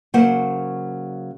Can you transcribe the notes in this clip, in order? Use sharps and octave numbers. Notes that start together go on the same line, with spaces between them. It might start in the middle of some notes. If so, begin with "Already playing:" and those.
C#3 F#3 A#3 C5 F#5